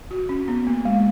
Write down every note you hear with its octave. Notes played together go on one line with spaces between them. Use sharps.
F#4
C#4
B3
A#3
G#3